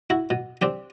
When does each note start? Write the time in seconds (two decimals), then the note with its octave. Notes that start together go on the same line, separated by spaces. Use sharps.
0.10 E4 F#4
0.30 B2
0.61 C4 D4 G4